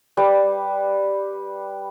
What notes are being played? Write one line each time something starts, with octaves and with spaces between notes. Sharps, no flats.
G3 B4 D6